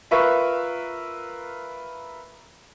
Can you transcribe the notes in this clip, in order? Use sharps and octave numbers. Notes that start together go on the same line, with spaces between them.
F4 A#4 B4 E5 C#6